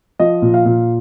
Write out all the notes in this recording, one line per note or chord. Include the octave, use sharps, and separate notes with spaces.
F3 D#5
A#2
F5
A#2